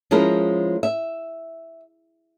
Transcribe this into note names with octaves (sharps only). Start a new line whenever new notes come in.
F3 G#3 C#4 E4 A#4
E5